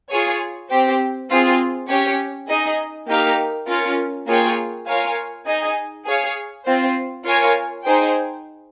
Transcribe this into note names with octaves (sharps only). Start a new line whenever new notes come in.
F4 G#4 C#5
C4 G4 C5
C4 F4 G#4
C#4 G4 C#5
D#4 G#4 D#5
A#3 D#4 G4 A#4 F5
C#4 F4 A#4
A#3 F4 G#4 C#5 G5
F4 A#4 C#5 F5 G#5
D#4 G#4 D#5 G#5
G#4 C#5 F5
C4 F4 C5
F4 A#4 C#5 G#5
D#4 G#4 C5 G5